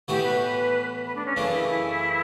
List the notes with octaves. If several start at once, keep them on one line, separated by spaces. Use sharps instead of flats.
A2 E3 B3 F#4 G4 A4
B4
B4
B4
D4
C#4
F#2 C#3 E3 A3 D4
E4
E4